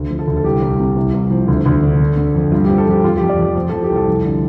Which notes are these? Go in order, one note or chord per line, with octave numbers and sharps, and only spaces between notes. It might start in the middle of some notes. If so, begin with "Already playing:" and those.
Already playing: D2
F3
A4
D2
A4
C2 G4
C2
C3
C2
C2
F3
D2
D2
D3
D3
D3
F2
G2 F4
G4
F3
A4
F3 G4
F2 F4
G4
F2
D5
F2
F3 C5
F3 A4
G4
C2
A4
F2
D3